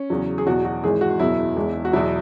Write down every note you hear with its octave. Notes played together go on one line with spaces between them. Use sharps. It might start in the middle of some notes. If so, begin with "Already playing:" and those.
Already playing: C#4
E2 C#3 F#3
G#4
E2 B2 F#3 F#4
F#4
G#1 G#2 E3 G#3 G#4
F#4
F#1 E2 B2 F#3 E4
E1 E2 E3 G#3
F#4
E2 B2 F#3 E4